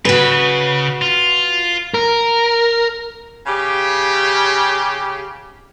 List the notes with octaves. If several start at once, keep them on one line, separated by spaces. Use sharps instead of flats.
C#3 F#4 B4
F4
A#4
C#3 G4